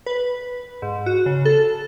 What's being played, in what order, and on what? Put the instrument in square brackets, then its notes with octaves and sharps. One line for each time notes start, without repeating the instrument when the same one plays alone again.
[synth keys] B4
G#2
F#4
C#3
A4